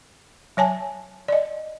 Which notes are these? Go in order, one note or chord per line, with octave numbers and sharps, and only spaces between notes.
F#3 C#5 G#5 A5
D5 D#5